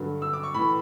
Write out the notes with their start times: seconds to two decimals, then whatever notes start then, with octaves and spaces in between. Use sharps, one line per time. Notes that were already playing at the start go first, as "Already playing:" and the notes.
Already playing: G2 D3 F#3
0.22 E6
0.33 D6
0.43 C#6
0.54 A2 E3 B5